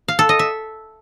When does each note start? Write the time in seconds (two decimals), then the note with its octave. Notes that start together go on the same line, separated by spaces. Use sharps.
0.08 F5
0.19 A4
0.29 D#5
0.39 E5